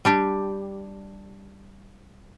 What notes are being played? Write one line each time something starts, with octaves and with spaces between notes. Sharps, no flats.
G3 D4 G4